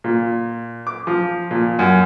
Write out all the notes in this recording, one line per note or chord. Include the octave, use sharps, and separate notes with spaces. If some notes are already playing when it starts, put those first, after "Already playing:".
A#2
D6
F3
A#2
F#2